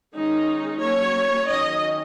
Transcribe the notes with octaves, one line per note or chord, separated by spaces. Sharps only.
D#3 G#3 C#4 D#4
F#3 A#3 C#4 C#5
D#3 F#3 C#4 D#5